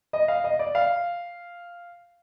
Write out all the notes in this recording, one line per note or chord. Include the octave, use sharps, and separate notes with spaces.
D#5
F5
D#5
D5
F5